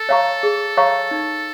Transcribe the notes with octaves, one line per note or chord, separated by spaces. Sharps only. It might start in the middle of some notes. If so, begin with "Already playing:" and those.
Already playing: A4
C#5 F5 A#5 C#6
G#4
C#5 F5 A#5 C#6
D#4